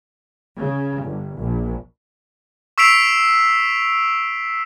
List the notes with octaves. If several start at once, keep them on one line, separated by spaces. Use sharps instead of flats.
C#3
G1
A#1
C#6 E6 B6 C7 D7 F7